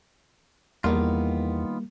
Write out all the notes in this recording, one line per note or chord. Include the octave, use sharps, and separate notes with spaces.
E2 D#3 G3 A#3 B3 F4